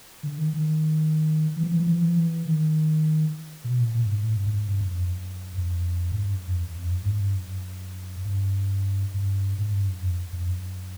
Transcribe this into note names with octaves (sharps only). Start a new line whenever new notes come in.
D3
D#3
D#3
E3
F3
E3
F3
E3
F3
E3
F3
E3
D#3
B2
A#2
A#2
G2
G#2
A2
G2
G#2
G2
F#2
F2
F#2
F2
G#2
G2
F#2
F2
E2
F2
F#2
G2
G#2
G2
F#2
G2
G2
G#2
G2
F#2
F2
F2
F#2